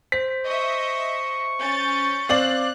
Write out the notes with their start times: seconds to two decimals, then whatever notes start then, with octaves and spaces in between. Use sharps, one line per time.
0.12 C5 B6
0.45 D#5 E5 C#6
1.59 C#4 G6 A6
2.29 C4 D5 F5 F#6 F#7